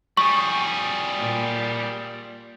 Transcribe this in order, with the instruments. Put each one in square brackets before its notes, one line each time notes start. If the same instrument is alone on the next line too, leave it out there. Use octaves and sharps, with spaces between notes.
[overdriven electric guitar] G3 G#4 [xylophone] C#6
[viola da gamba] A#2